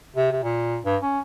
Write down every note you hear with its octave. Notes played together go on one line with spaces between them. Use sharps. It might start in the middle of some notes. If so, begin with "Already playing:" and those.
C3
C3
A#2
G2
C#4